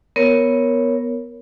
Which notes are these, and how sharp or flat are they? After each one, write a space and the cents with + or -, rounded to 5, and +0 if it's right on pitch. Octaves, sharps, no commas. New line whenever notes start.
B3 +0 A#4 +0 C#5 +0